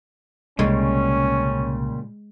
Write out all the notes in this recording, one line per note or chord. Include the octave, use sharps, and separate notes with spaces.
C2 A#2 C#3 G3 G#3 C#4